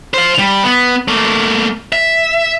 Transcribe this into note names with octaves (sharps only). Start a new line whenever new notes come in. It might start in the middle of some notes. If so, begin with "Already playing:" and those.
C5 F5
G3
B3
A3 A#3
E5